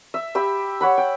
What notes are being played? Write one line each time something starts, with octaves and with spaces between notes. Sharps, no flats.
E5
G4 E5 B5
C#5 F#5 B5
G5